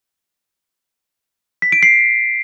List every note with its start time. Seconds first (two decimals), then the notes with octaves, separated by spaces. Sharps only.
1.62 B6
1.72 D7
1.83 C7